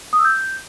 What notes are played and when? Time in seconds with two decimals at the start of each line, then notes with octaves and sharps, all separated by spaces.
0.13 D#6
0.19 E6
0.25 G6